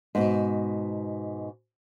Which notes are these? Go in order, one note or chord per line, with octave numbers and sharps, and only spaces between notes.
G#2 B2